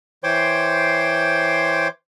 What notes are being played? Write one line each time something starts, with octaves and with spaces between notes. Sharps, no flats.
E3 C5 C#5 G5 C6 D6